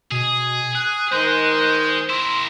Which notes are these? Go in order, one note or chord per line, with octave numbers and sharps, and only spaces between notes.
B2 G#4
G#4 F#6
D#3 G#4 C5 D#5
E4 A#4 C6